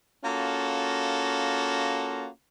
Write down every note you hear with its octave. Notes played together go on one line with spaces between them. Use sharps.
A#3 C#4 F4 F#4 A4